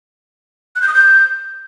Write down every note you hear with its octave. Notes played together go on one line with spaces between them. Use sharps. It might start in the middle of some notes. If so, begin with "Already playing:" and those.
F#6
G6
D#6
G6